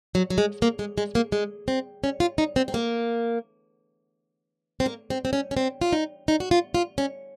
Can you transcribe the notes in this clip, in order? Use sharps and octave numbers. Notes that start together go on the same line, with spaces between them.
F#3
F#3
G#3
A#3
G#3
G#3
A#3
G#3
C4
C#4
F4
D#4
C4
C4
A#3
C4
A#3
C4
C4
C#4
C#4
C4
F4
D#4
D#4
F#4
F4
F4
C#4